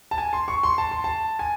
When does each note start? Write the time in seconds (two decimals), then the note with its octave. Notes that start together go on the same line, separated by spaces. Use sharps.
0.11 A5
0.18 G#5
0.33 C6
0.48 C#6
0.63 C6
0.78 A5
0.91 C6
1.04 A5
1.39 G#5